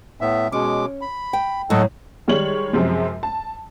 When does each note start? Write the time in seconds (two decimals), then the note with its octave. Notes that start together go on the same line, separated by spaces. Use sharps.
0.21 A2 B3 E5
0.52 B2 G#3 C#4 D6
1.01 B5
1.33 G5
1.70 A2 F#3 A4 D#5 F#5
2.28 D#3 G3 G#3 C#5 F#7
2.73 F#2 C3 F3 G#3
3.23 A5